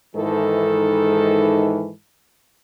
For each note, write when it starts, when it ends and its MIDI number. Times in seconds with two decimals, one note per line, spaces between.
0.15 1.90 44
0.15 1.90 51
0.15 1.90 52
0.15 1.90 69